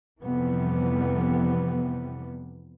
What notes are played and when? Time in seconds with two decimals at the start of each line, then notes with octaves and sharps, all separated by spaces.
0.22 F2 C3 E3 G3 B3